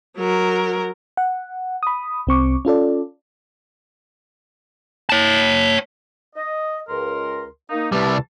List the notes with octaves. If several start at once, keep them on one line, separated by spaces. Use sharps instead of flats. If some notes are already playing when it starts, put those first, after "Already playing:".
F#3 A#4
F#5
B5 D#6
C2 C4 C#6 D6
C#4 F4 A4 D5
C#5 A5
D#5
C#2 A#4 C6
A#3 D#4
C2 G3 B4 E5 A5